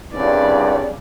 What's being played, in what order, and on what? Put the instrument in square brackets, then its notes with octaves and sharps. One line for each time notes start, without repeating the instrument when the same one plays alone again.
[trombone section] C2 G2 C#3 [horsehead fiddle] D5